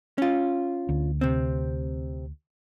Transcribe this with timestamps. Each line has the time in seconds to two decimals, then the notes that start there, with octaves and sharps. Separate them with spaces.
0.18 C#4 F4
0.89 D2
1.21 C3 C4